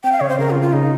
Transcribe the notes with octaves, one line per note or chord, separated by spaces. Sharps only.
C4 G5
F5
C#3 C#5
C5
C#3 A#4
F4
C#3
F4
C#3 D#4